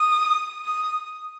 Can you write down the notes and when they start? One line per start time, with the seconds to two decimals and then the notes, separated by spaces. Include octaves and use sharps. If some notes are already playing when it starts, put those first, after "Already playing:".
Already playing: D#6
0.65 D#6